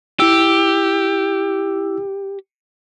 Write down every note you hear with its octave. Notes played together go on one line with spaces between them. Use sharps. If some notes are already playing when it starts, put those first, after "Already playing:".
E4 G4 E6